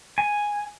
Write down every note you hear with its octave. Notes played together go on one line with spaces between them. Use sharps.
G#5